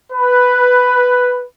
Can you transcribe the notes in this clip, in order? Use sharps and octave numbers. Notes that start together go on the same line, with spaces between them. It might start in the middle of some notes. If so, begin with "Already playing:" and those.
B4